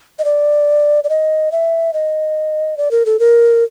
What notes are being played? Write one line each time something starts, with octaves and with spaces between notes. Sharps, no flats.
D#5
D5
D5
D#5
E5
D#5
D5
A#4
A4
A#4